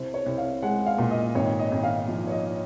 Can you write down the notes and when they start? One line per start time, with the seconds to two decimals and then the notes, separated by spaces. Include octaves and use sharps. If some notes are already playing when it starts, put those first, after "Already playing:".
Already playing: C2 C5
0.14 C#5
0.26 C2
0.38 F5
0.62 G#3 F#5
0.86 F5
0.98 A#2
1.11 D#5
1.35 G#1 C#5
1.59 D#5
1.72 G#1
1.84 F5
2.08 F3
2.27 C#5
2.32 D#5